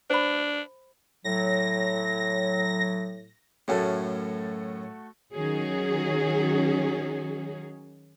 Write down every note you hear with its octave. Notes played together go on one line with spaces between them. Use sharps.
D4 C5 B5
A2 F#3 A#6
F#2 A2 A3 C#4 F#4 A4
D#3 F#3 C#4 F#4 G#4